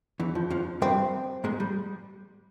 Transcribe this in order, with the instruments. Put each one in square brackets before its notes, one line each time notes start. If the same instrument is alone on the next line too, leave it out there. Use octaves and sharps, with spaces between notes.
[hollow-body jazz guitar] E2 E3
F2 F3
F2 F3
[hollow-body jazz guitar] G2 G3 [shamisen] C4
[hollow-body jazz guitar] G#2 G#3
G3